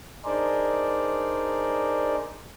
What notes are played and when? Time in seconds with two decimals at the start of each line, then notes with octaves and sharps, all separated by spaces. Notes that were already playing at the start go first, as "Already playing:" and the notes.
0.25 D4 D#4 G#4 A#4 C5 D5